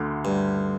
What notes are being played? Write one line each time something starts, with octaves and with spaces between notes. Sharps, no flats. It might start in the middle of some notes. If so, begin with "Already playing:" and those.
Already playing: D2 D3
G2